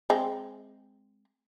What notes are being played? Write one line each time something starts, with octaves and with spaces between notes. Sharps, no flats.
G#3 C4